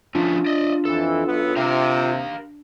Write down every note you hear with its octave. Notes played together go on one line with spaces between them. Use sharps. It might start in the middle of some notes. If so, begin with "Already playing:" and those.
F3 A3 C#4 D4 F4
D5 D#5
F2 E3 A4
B1 B3
C3 G4 A#4 F5